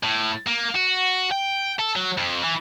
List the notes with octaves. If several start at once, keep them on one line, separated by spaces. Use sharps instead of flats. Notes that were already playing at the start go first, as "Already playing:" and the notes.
A2
A#3
F#4
G5
A4
F#3
F2
E3